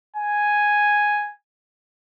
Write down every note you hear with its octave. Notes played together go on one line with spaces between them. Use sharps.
G#5